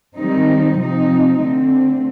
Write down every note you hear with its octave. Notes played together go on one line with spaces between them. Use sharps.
D#3 G3 C4 D#4
C3 F3 C4 D#4
D3 A3 C4